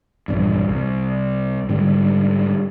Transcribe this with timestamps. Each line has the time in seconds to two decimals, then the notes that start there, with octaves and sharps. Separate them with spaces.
0.28 A#1 E2 G2
0.69 C2
1.69 G#2 D3 G3